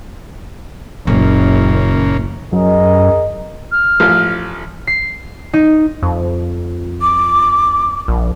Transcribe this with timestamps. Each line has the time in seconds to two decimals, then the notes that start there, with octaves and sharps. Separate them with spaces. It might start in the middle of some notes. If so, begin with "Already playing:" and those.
1.07 F#1 A#2 C#3 E3 A#3
2.52 F#2 G#4 A#4 D#5
3.72 F6
4.00 A1 F3
4.87 C7
5.53 D#4
6.03 F2
7.01 D6
8.08 A#1